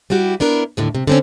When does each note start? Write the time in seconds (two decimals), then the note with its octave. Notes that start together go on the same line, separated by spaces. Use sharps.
0.10 G3 E4 F#4 G4
0.40 B3 D4 E4 A#4
0.77 D#2 A2 D3
0.95 C3
1.07 D3 C4 C#4